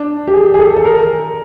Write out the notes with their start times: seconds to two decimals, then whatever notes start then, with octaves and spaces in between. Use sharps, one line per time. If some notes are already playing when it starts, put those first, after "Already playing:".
Already playing: D4
0.27 G4
0.33 G#4
0.54 G#4
0.59 A4
0.76 A4
0.85 A#4